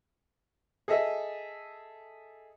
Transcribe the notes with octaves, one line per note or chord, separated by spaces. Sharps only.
G#4 A4 D#5 E5